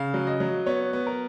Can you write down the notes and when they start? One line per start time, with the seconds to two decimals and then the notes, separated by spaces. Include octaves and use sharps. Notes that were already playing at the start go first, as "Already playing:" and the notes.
Already playing: C#3 F5
0.14 F#3
0.27 D#5
0.40 F#3
0.66 B3 C#5
0.93 B3
1.07 A#4